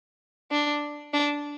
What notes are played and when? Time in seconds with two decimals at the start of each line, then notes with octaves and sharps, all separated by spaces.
0.51 D4
1.13 D4